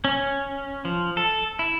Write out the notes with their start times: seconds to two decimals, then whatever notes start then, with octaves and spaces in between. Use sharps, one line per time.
0.05 C#4
0.85 F3
1.17 A4
1.59 E4